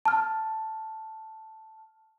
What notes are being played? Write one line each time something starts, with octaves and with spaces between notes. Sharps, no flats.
A5 F6